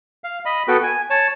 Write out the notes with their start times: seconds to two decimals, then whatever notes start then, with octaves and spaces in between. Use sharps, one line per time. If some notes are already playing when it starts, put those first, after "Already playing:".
0.24 F5
0.45 D#5 B5
0.68 B3 F#4 A4 B4 G5
0.83 G#5
1.10 C#5 A5